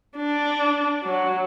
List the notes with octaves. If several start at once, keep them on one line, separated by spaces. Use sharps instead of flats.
D4
F#3